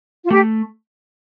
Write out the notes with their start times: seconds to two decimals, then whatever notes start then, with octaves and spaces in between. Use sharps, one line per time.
0.24 F4
0.31 A3 G4